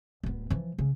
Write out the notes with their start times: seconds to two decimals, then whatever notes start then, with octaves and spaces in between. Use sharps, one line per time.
0.23 D1 B3
0.50 E3 F3
0.78 C#3